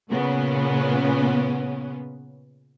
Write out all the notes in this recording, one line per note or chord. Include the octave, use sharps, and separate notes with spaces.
A#2 C#3 B3 C#4